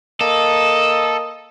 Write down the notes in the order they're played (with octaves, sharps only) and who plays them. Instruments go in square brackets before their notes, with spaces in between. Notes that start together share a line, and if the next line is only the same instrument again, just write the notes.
[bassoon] A#3 [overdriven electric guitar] A4 [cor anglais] D#5